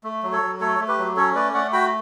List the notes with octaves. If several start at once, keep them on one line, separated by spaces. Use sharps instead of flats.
A3
F#3
A4 C#5
F#3
A3 A4 C#5
A3
G4 B4
F#3
C#4 A4 C#5
A3 B4 D5
A3 D5 F#5
F#4 G5 B5